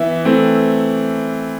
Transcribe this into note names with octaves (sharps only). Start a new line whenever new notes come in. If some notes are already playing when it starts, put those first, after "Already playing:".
Already playing: E3 B3 E5
E3 A3 C4